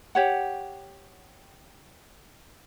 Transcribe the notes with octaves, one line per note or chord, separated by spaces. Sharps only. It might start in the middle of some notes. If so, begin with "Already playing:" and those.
G4 C#5 F#5